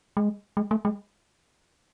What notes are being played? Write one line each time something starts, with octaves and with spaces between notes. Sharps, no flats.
G#3
G#3
A3
G#3